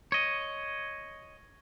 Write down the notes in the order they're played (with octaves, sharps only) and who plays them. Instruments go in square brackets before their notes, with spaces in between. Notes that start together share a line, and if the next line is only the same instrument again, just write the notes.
[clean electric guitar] C#5 D#5